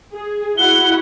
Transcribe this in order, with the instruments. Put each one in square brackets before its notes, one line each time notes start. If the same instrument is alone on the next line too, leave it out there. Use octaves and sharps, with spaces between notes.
[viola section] G#4
[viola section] E4 F#4 F#5 [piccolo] G7